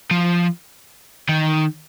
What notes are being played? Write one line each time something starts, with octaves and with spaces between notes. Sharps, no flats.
F3
D#3